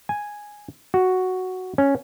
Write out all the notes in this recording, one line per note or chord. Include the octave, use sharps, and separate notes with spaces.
G#5
F#4
C#4